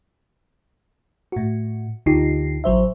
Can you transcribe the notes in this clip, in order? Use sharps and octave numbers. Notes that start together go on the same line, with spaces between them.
A2 F#4
D2 D3 D#4 F4 G4 C7
A1 F#3 C5 E5